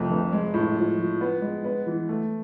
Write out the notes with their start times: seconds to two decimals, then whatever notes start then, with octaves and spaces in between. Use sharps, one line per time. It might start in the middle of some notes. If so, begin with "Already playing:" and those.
Already playing: C2 F2 A3
0.10 F1
0.32 G#3
0.54 A2
0.76 F3
0.98 F3
1.21 B3
1.42 G#3
1.64 B3
1.86 E3
2.09 A3